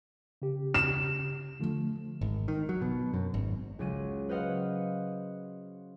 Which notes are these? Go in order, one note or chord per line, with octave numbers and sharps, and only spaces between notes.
C#3 G4
E7
D3 F3 A3
G#1
D#3
F#3
B2
F#2
G#1
C#2 F#3 D#7
B4 C5 D#5 F5 F#5